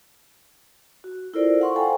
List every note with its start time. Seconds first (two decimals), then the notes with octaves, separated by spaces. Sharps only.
1.04 F#4
1.34 E4 F4 A4 A#4 C5 D5
1.60 F5 F#5 C6 C#6
1.76 A4 C5 F5 G5 G#5 A#5